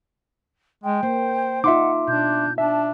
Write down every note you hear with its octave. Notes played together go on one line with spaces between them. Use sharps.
G#3 G5
A#3 C5
D#4 F4 E5 F#5 C6 D6
B2 D4 G6
D4 E5 A5